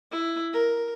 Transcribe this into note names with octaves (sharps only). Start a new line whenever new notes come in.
E4
A#4